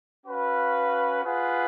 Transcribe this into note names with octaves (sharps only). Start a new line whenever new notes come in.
C#4 F#4 B4 F5
F4 G#4 B4 F#5